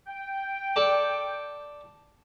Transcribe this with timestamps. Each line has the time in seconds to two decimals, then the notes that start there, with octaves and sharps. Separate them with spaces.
0.07 G5
0.76 A4 D5